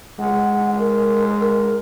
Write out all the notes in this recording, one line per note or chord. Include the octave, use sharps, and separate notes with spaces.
G#3 F#5
A#4
A#4